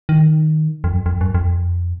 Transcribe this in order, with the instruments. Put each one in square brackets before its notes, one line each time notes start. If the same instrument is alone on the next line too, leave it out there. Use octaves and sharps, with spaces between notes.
[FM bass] D#3
F2
F#2
F2
F#2
F2